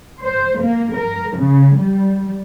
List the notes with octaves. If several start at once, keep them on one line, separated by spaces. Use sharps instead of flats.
C5
A#3
A#4
C#3
G3